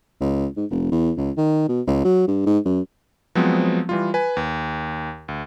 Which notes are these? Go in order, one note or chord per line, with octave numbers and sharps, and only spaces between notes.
C#2
G#2
F1
E2
C#2
D#3
B2
C#2
F#3
G2
G#2
F#2
F3 F#3 G#3 B3 C4
E3 G3 F4
B4 G#5
D#2
D2